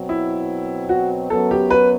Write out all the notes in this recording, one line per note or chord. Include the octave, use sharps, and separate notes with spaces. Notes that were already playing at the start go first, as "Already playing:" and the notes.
Already playing: B2 F#3 C4
E4
F#4
F#2 F#3 B3 A4
G4
B4